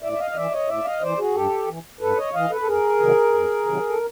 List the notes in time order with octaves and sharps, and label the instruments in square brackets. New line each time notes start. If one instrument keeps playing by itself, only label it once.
[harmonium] A2 D5 E5
E5
D#5 F5
D#5
E3 D5 E5
C#5 D#5
A2 D5 E5
D#5 F5
E3 C5 D5
F#4 G#4
G2 G4 A4
E3
G2 A4 B4
C#5 D#5
E3 D#5 F5
A4 B4
A4
F2 G#4 A#4
C3 D#3 F#3
F2
C3 D#3 F#3
A4